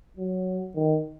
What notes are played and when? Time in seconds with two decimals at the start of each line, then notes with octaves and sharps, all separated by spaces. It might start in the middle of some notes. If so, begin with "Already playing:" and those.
0.17 F#3
0.75 D#3